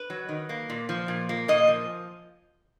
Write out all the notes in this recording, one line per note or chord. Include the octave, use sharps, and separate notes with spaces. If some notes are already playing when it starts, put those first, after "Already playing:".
Already playing: B4
F#3
D#3
A#3
A#2
F3
A#2
A#3
A#2 D#5
F3